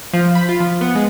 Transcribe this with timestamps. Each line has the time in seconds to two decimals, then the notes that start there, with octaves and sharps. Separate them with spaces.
0.13 F3
0.35 B5
0.49 F4
0.60 F3
0.81 B3
0.95 G#3